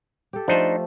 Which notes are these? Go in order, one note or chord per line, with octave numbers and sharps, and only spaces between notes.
G4 A4
F3 A3 D4 D#4 C5